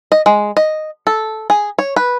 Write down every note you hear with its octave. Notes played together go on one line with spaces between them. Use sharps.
D#5
G#3
D#5
A4
G#4
C#5
B4